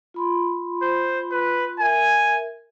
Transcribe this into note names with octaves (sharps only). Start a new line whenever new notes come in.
F4 B5 C6
C5
B4
A#4 E5 G#5